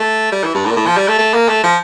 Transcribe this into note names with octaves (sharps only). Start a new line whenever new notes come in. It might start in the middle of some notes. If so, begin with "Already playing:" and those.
Already playing: A3
G3
E3
G2
A2
A#2
A2
F3
G3
A3
A3
A#3
A3
F3